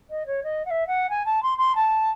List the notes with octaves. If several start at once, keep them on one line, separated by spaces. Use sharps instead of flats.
D#5
C#5
D#5
F#5
E5
F#5
G#5
A5
C6
C6
A5